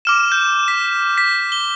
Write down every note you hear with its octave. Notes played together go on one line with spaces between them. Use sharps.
D6 F6 E7
G6
B6
B6
G7